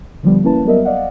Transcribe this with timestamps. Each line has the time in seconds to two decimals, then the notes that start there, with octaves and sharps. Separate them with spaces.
0.23 D3 F3 G3 B3
0.44 A#3 C#4 E4 B4 A5
0.65 F#3 G3 B3 A#4 D#5 E5
0.85 D5 D#5 F5 F#5